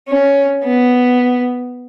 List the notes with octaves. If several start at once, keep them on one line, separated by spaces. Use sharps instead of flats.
C#4
B3